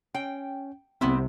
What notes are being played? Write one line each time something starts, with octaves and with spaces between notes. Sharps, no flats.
C#4 G5
C2 C3 B3 C4 E4